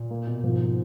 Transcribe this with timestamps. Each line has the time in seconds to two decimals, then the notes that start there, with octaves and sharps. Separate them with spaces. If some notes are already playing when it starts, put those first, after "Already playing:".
Already playing: A#2
0.10 A#3
0.27 B2
0.43 G#2 F3